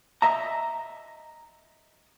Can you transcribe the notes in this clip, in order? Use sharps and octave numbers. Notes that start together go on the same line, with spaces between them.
D#5 E5 A#5